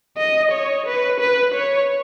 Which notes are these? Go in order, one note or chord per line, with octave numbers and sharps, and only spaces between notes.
D#5
C#5
B4
B4
C#5